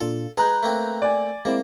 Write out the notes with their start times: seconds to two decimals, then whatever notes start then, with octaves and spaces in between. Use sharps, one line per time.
0.01 A#2 D4 F4 A4
0.37 G#3 G#4 B4 A#5 F#6 G6
0.63 A3 A#3 C4
1.02 D5 G#5
1.45 G#3 A#3 C4 E4